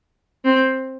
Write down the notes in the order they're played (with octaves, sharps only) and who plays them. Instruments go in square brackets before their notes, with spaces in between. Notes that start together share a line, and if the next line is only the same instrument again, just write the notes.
[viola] C4